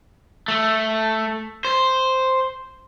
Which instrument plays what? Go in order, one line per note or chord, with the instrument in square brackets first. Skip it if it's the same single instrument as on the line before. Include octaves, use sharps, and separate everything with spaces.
[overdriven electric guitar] A3
C5